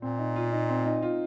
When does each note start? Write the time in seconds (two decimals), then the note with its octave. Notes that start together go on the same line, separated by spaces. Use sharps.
0.01 A#2 C4
0.19 D#4
0.36 F4
0.52 D#4
0.69 C4
0.86 D#4
1.02 F4